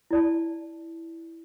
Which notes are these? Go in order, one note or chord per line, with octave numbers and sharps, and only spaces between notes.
E4 D5 A5